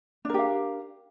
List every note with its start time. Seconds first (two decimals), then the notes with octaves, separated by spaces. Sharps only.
0.25 D4
0.29 A#4
0.34 G4
0.39 F5